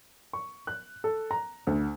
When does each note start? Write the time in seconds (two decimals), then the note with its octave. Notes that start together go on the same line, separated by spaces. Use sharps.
0.33 C#6
0.67 F#6
1.04 A4
1.31 A#5
1.67 D2